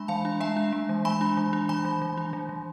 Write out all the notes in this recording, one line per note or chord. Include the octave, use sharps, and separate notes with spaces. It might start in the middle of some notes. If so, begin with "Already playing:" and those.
Already playing: G#3 D4 G#5 B5
E3 F5 A5
D4
G#3 E5 G#5
D4
G#3
E3
G#3 G#5 B5
D4
E3
D4
E3 G#5 B5
E3
E3
D4
E3
E3